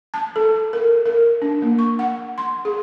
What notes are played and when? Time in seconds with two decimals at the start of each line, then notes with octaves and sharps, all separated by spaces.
0.14 A5
0.36 A4
0.73 A#4
1.05 A#4
1.42 D4
1.62 A#3
1.79 C#6
1.99 F#5
2.38 C6
2.65 G#4